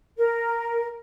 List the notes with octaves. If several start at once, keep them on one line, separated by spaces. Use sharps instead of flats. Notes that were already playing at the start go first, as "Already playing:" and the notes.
A#4